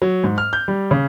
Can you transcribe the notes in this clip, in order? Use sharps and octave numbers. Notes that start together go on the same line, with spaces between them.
F#3
G#2
F6
G6
G3
C#3